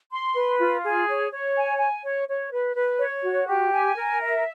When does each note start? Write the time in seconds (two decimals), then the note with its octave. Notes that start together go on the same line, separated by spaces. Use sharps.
0.11 C6
0.35 B4
0.59 F4
0.84 G#4
1.07 C#5
1.32 C#5
1.56 G#5
1.79 G#5
2.04 C#5
2.28 C#5
2.51 B4
2.75 B4
3.00 C#5
3.23 F#4
3.48 G4
3.72 G#5
3.96 A#4
4.21 E5